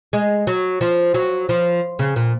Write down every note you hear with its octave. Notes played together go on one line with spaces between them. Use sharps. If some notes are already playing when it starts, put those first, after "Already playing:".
G#3
F#3
F3
F#3
F3
C#3
A#2